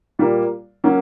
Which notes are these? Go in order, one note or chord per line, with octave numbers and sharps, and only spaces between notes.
A#2 G3 A#3
F#3 A#3 C#4